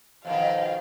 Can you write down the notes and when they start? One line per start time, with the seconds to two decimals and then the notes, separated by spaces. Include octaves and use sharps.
0.25 F2 B2 D#3 F5